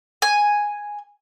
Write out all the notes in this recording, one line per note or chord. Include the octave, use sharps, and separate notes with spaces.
G#5